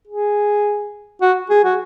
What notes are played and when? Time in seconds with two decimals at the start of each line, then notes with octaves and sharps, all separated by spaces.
0.07 G#4
1.21 F#4
1.50 G#4
1.64 F#4